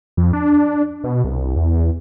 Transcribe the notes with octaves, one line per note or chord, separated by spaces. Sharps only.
F2
D4
B2
C2
E2